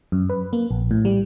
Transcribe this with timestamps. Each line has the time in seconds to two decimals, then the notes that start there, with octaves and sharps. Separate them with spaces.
0.12 F#2
0.30 B4
0.53 A#3
0.71 A#1
0.91 A2
1.05 G3